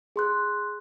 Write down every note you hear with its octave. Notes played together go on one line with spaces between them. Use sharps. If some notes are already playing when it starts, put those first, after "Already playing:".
G#4 C6 F#6